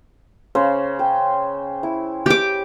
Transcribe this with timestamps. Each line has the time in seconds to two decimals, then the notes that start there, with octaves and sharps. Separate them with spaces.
0.55 C#3 C5
0.99 G5
1.83 E4
2.26 G4 D6